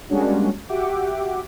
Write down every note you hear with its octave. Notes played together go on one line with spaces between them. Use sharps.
G3 G#3 A#3 C#4 D4 F#4
F#4 G4 E5 F#5 G5 D6